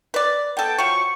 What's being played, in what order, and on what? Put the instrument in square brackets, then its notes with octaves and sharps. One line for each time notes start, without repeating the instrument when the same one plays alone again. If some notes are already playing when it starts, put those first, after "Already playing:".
[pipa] B4 D5
[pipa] B3 A4 [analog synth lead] G5
[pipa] F3 F#3 [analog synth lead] C#6